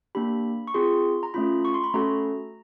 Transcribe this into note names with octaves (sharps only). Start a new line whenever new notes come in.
A#3 D4 G4 B5
C#6
C4 F4 G#4 C6
A#5
A3 C#4 F4 B5
C#6
C6
B5
A3 C#4 F#4 A4 A#5